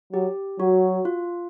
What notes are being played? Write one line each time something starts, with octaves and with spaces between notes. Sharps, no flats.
F#3 G4
F#3 F#4
F4